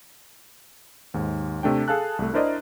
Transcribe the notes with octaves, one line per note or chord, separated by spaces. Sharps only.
D#2 G#2
C3 A3 D4 G5
G#4 A4 F5 A5 F#6
C2 A3
D4 E4 A#4 C5 D5 D#5